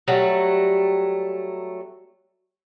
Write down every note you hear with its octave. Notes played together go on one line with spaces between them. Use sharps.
F#3 G3 A3